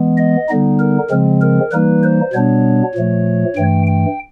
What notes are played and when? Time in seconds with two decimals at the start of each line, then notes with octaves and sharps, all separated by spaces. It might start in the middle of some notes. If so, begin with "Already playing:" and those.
Already playing: E3 G#3 B3
0.18 D#5
0.49 D3 G3 B3 D#4
0.80 A#4
1.10 C#3 F3 G#3 C4
1.41 A#4
1.71 E3 G3 A#3 D#4 B4
2.03 C5
2.33 B2 G3 B3 D4 C#5
2.95 A#2 F3 A3
3.56 G2 E3 A3 G5
3.87 G5